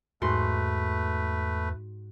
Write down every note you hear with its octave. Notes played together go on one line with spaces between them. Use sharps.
E2 G#2 A3 F#4 B4 C6